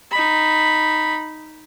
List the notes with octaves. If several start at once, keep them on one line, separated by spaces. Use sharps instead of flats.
D#4 B5